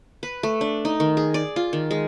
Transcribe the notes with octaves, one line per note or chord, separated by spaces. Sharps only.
B4
A3
D4
D#4
D#3
G#4
D5
F4
D#3
G#3